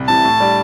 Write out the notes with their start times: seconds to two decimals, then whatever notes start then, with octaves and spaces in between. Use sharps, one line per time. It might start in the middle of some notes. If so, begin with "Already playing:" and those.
Already playing: C2
0.08 C3 E3 A5
0.24 A2
0.40 G3 D4